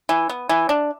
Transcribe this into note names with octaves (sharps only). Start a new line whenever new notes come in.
E3
B3
E3
D4